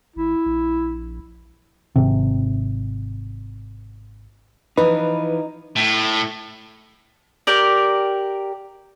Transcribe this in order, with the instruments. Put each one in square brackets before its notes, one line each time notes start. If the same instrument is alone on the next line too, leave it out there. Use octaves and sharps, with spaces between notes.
[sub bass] G#1 [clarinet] E4
[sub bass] A#1
[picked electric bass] G#1 C3
[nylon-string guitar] E3 F3 [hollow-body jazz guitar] D#4 [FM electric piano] B4
[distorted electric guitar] A2
[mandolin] G4 A#4 D5